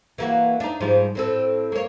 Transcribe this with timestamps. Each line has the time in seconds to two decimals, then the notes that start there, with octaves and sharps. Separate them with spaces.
0.18 E3 A#3 F#4
0.60 D4 D#4
0.80 G#2 F3 G3
1.15 A2 C4 A4
1.72 A#3 C#5